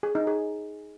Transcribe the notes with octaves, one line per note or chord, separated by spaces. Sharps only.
G#4
D#4
G#4